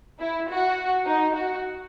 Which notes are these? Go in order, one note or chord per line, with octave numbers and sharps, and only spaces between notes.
E4
F#4
D#4
F#4